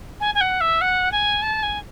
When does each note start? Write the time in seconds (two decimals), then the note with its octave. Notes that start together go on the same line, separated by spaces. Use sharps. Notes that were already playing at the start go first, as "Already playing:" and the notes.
0.20 G#5
0.35 G#5
0.41 F#5
0.61 E5
0.81 F#5
1.12 G#5
1.42 A5
1.63 G#5